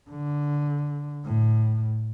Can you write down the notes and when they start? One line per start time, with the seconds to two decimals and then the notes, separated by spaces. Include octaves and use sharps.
0.11 D3
1.25 A2